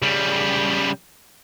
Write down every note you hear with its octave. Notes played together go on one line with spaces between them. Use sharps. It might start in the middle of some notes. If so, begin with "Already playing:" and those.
C#3 G3